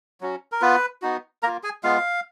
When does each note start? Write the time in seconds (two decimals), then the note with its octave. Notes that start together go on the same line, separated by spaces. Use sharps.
0.21 F#3 C#4 F#4
0.52 A#4
0.61 B3 F4 B4
1.02 B3 D#4 F#4
1.43 A#3 F4 A#4 A#5
1.63 G#4 G#5
1.83 G#3 B3 F4 F5